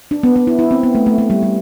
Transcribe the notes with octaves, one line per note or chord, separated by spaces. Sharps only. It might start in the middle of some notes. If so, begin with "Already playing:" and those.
D4
B3
B3
E4
E4
C4
B3
A3
A3
A3
G3
G3